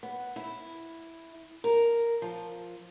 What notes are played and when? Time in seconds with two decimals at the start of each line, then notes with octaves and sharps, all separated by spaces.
0.03 B3
0.36 E4
1.64 A#4
2.22 F3